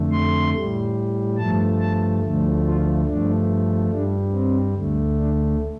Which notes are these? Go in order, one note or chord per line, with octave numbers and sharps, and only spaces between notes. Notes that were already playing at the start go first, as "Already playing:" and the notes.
Already playing: F2 D3 A3
C6
A2 G3
G2 F3 A3 A5
A5
D2 D3 F3 A3
F4
G2 F3 A3 D4
G2 G3 D4
C4
D2 D3 A3
D4